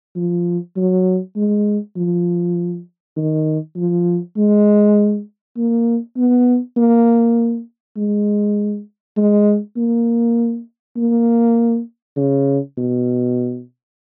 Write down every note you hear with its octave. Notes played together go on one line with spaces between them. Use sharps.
F3
F#3
G#3
F3
D#3
F3
G#3
A#3
B3
A#3
G#3
G#3
A#3
A#3
C#3
B2